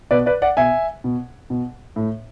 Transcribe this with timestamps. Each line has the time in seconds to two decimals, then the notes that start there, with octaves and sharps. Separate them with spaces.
0.11 B2 B4 D5
0.26 B4 D5
0.42 D5 F#5
0.57 B2 E5 G#5
1.04 B2
1.50 B2
1.96 A2